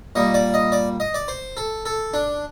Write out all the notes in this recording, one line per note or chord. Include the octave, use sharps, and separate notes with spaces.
A#2 G3 D#5
D5
D#5
D5
D#5
D5
C5
A4
A4
D4